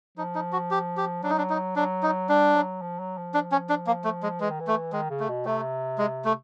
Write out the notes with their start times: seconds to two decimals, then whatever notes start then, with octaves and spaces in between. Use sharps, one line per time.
0.17 F3 D#4
0.35 D#4
0.52 F#4
0.71 G4
0.97 G4
1.23 F#3 D4
1.30 D#4
1.38 D4
1.50 D#4
1.76 F#3 D4
2.03 D#4
2.29 G3 D4
2.55 F#3
2.81 F3
2.99 F#3
3.17 F3
3.34 D4
3.52 C#4
3.69 D4
3.87 A#3
4.04 A3
4.23 G#3
4.40 E3 G#3
4.50 D#3
4.60 E3
4.67 A3
4.93 D#3 G#3
5.10 C#3
5.20 A3
5.28 B2
5.45 C3 A3
5.98 G#3
6.25 A3